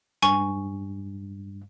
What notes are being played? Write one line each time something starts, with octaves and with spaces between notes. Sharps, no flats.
G2 G#5 C#6